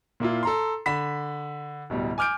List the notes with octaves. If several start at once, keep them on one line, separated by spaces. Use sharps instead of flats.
A#2 A#3 E4 F4
A4 A#5 C6
D3 B5 B6 E7
D1 B2 G3
G#5 D6 F6 G6 D7